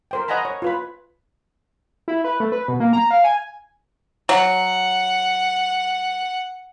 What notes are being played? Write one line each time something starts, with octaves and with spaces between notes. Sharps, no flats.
A#4 C5 G5
C5 D#5 F#5 G#5 A#5 B5
C#5
F4 B4 B5
E4
B4
A3
B4
B2
A#3
A#5
F5
G#5
F#3 F#5